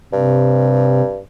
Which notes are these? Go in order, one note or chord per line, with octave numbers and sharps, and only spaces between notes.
G2 C3